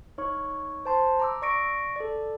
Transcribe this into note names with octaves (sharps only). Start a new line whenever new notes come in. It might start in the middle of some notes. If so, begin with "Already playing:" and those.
D#4 C#5 C#6
C5 A5 C6
A#5 D6 E6
D5 C#6 A#6 D7
A4 D5